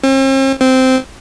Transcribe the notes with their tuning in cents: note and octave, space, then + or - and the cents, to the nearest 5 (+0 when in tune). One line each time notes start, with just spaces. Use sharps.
C4 +45
C4 -10